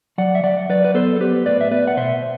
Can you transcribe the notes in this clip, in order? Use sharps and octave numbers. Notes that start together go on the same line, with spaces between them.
F#3 D5 F#5
E5
F#3 D5 F#5
F#3 B4 D5
B4
B3 A4 C5
A4
B3 G4 B4
A2 B4 D5
E5
B3 B4 D5
F#5
B2 C5 E5